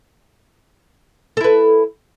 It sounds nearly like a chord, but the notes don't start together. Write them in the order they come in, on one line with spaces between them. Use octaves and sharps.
A4 E4 B4